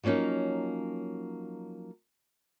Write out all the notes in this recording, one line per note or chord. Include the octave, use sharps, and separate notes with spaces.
F3 F#3 A#3 C#4 D#4